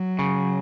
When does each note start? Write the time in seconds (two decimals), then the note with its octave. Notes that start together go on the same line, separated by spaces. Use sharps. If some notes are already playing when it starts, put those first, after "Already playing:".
Already playing: F#3
0.19 C#3